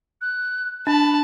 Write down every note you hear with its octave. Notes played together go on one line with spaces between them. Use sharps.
F#6
D4 A5 B5